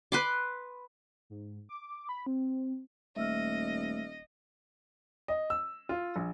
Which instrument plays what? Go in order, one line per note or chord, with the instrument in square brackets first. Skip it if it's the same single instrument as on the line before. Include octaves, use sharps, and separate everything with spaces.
[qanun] B4 C6 D6
[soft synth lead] G#2
D6
B5
C4
[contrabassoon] D#1 [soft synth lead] A3 [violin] D#5 [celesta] E5 E6 F6
[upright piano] D#5
E6
F4
A#1